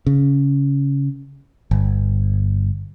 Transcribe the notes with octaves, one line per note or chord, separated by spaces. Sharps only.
C#3
G1